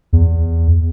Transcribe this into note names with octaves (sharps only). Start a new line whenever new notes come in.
E2